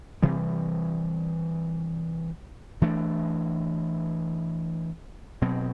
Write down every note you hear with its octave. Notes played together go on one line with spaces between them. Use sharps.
C3 E3 G3 C4
E3 A3 D4
B2 F#3 C4